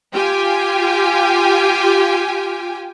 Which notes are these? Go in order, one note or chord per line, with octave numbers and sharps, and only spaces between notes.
F4 G4 G5 G#5